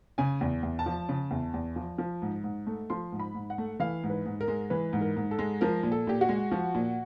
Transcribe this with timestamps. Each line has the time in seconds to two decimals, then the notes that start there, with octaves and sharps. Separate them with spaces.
0.18 C#3 G#5
0.41 E2
0.63 E2
0.79 A5
0.86 F3
1.09 C#3
1.31 E2
1.54 E2
1.76 F3
1.98 F3
2.22 G#2
2.44 G#2
2.67 A3
2.90 F3 C6
3.12 G#2
3.19 B5
3.35 G#2
3.50 F#5
3.58 A3
3.80 E3 F5
4.03 G#2
4.10 B4
4.26 G#2
4.41 A#4
4.48 G#3
4.70 E3 B4
4.93 G#2
5.01 A#4
5.17 G#2
5.31 A4
5.39 G#3
5.61 F3 A#4
5.83 A#2
5.92 A4
6.07 A#2 G4
6.21 F#4
6.29 G#3
6.52 F3
6.75 A#2